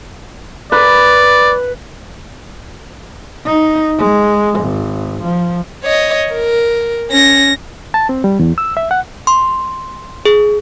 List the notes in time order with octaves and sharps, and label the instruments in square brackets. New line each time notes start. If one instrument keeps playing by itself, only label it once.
[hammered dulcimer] B4 [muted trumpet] D5
[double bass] D#4
G#3
G#1
F3
[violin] C#5 D#5
A#4
C#4 A#6
[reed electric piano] A5
C4
G3
E2
E6
E5
F#5
[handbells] C6
G#4